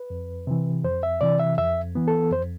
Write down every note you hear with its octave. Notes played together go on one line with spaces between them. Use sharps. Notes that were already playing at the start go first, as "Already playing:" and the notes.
Already playing: B4
F2
C3 E3
F2 C5
E5
C3 E3 D5
E5
F2 E5
E3 B3
A4
F2 C5